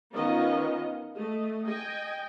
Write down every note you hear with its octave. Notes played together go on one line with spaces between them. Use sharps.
D#3 B3 C#4 F4 D#5
A3 D#5
D#5 G5 G#5